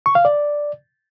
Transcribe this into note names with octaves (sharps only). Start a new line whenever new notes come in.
C#6
F5
D5